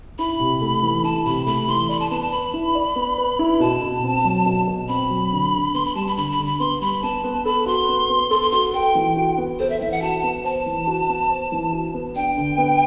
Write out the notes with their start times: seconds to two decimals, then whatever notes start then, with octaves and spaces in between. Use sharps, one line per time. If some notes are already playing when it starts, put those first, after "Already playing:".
0.19 E4 B5
0.39 C3
0.61 A3
0.83 E3
1.04 E4 A5
1.25 C3 B5
1.46 A3 B5
1.68 E3 C6
1.89 D5 B5
2.00 A5
2.11 B3 A5
2.21 A5
2.32 B4 B5
2.54 E4
2.75 D5
2.96 B3
3.18 B4
3.39 E4
3.60 B2 A5
3.82 B2
4.03 C4
4.25 F#3
4.46 B2
4.67 B2
4.88 C4 B5
5.10 F#3
5.32 D3
5.53 D3
5.74 B3 C6
5.85 B5
5.95 G3 A5
6.07 B5
6.17 D3 B5
6.32 B5
6.39 D3
6.46 B5
6.60 B3 C6
6.81 G3 B5
7.02 B3 A5
7.24 B3
7.45 A4 B5
7.66 F#4 C6
7.88 B3
8.09 B3
8.31 A4 C6
8.42 C6
8.52 F#4 C6
8.74 A4 G5
8.95 E3
9.16 F#4
9.38 B3
9.59 A4 C5
9.70 E5
9.80 E3 E5
9.91 F#5
10.02 F#4 A5
10.23 B3
10.44 C5 A5
10.66 E3
10.87 F#4
11.09 B3
11.30 C5
11.52 E3
11.73 F#4
11.94 B3
12.15 D4 G5
12.37 D3
12.58 B3